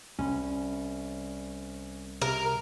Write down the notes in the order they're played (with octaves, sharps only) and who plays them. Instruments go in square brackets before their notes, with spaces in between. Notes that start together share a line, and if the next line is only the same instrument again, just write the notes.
[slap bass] C2 [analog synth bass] C#4
[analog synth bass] C3 [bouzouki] A#4